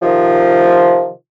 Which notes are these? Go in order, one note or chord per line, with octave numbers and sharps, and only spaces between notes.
C3 D#3 F3